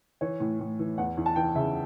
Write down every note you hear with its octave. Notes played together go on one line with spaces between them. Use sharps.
E3 C#5
A2
A2
E3
E2 F#5
E2
A5
E3 G5
C#3 E5